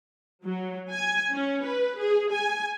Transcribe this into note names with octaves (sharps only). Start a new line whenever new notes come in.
F#3
G#5
C#4
B4
G#4
G#5